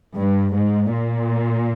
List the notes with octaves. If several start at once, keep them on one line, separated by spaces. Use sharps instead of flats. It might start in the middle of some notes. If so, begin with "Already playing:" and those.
G2
G#2
A#2